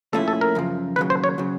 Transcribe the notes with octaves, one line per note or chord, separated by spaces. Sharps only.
A#2 F3 A3 C#4 E4 A4
A4
A#4
F#2 C#3 F3
D#2 C#3 F#3 B4
C5
C#5
C#3 F#3